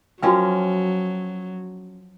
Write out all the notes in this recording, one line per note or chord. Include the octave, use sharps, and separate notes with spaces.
F3 F#3 C#4 F#4 A#4 G5